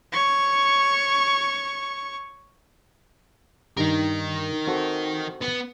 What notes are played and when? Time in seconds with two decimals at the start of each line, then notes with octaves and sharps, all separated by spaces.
0.13 C#5 C#6
3.77 G2 D#3 D#4 A#4
4.67 C4 F#4 A4
5.41 B3